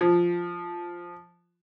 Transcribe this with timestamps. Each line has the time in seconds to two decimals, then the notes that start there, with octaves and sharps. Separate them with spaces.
0.01 F3